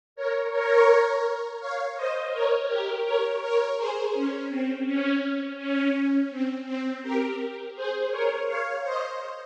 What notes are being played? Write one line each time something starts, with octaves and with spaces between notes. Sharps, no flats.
A#4 C#5
A#4 C#5
C#5 F5
C5 D#5
A#4 C#5
G4 A#4
A#4 C#5
A#4 C#5
G#4 C5
C#4
C4
C#4
C#4
C4
C4
G4 A#4
G#4 C5
A#4 C#5
C#5 F5
C5 D#5